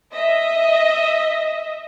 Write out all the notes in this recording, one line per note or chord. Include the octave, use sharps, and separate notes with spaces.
D#5 E5